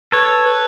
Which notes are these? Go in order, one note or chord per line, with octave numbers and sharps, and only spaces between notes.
A4 B4 C#5
B4